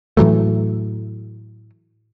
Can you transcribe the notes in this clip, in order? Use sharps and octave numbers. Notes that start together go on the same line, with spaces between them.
A2 E3 F#3 A3